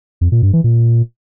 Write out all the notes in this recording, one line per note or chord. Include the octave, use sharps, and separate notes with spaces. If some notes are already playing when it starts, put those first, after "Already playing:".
F2
A#2
G2
E3
A#2